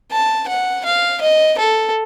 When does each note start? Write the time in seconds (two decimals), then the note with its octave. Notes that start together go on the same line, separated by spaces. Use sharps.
0.12 A5
0.48 F#5
0.86 F5
1.22 D#5
1.58 A4